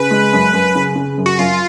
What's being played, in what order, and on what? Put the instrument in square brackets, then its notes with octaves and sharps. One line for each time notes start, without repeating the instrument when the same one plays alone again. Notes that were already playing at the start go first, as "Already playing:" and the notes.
Already playing: [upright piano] C#3 [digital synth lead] B4
[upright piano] G#3
F#2
F#2
C#3
C#3
F#2
[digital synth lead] F#4
[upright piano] F#2 [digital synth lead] F4